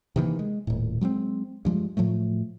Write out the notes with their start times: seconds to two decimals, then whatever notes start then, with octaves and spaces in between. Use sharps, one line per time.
0.16 C3 D#3 E3 A#3
0.39 G#3
0.67 D#1 A2
1.01 F#3 G#3 A#3 C4
1.65 G2 F3 G#3
1.97 A2 F3 F#3 A3